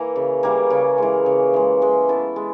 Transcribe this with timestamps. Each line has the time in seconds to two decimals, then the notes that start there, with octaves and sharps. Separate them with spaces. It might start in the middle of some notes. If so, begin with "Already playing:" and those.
Already playing: E3 A#3
0.16 C#3
0.43 E3 G3 A#3
0.70 C#3
0.98 E3 G#3
1.26 C#3
1.54 E3 G#3
1.82 G#3
2.09 B3 E4 A4
2.36 G#3